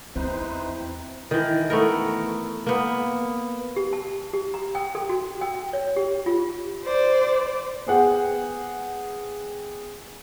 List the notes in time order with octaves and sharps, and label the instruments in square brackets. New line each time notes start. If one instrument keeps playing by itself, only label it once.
[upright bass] E2 [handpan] C4 [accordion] D#4 B4 C5 [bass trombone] E4
[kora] D#3 E3
A3 B3 A#4
A#3 B3
[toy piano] G4
A5
G4
A#5
G5
A4
F#4
G5
C#5
G4
F4
[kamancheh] C5 D5
[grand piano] B3 G#4 F#5 G5